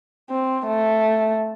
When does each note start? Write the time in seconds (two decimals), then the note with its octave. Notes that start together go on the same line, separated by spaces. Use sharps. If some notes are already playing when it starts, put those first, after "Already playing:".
0.31 C4
0.67 A3